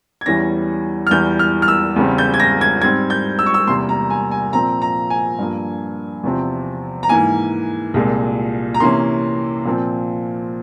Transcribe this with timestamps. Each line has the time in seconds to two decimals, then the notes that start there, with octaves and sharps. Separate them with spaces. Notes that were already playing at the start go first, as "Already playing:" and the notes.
0.21 G#6
0.26 E2 E3 G3 C#4 A#6
1.07 F6
1.11 E2 E3 G3 G6
1.39 F6
1.62 F6
1.68 E6
1.96 E2 C#3 G3 C4
2.18 G6
2.34 G#6
2.40 A#6
2.61 G#6
2.82 G#2 G3 C4 G#6
3.10 G6
3.39 E6
3.46 C#6
3.54 E6
3.67 E2 C3 G3 A#3 C6
3.89 A#5
4.10 G#5
4.31 G#5
4.53 A#2 F3 C4 A#5
4.82 A#5
5.10 G#5
5.38 G2 F3 A#3
6.23 E2 C3 F3 C4
7.03 A#5
7.09 G#2 E3 A#3 G#5
7.94 C2 A#2 G#3
8.74 A#5
8.80 C3 E3 A#3 C#4 C6
9.65 A#2 F3 C4